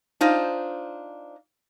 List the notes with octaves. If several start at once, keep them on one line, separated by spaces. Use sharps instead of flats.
D4 D#4 F4 C5